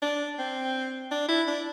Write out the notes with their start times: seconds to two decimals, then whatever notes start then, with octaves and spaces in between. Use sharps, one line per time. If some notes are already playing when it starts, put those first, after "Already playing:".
0.02 D4
0.39 C4
1.11 D4
1.28 E4
1.47 D4